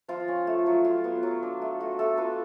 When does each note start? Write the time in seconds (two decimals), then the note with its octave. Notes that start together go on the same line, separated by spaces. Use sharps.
0.08 F3 F4
0.28 C#4
0.47 A3
0.66 F#3
0.85 F4
1.04 B3
1.23 F#3
1.43 D4
1.62 A3
1.80 A3 F#4
1.99 A3 A4
2.17 F4 B4